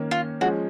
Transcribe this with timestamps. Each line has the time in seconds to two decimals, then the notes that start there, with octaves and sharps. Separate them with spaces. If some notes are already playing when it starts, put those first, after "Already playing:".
Already playing: D#3 A#3 C#4
0.11 F4
0.41 F3 G#3 C#4 F#4